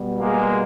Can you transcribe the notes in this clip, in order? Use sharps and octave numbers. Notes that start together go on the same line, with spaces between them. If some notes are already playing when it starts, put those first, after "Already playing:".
Already playing: B2 G3
G#3 A#3